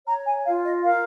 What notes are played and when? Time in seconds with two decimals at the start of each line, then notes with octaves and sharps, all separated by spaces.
0.06 C#5 A#5
0.25 G#5
0.44 F4 F5
0.65 D#5
0.83 A#4 F5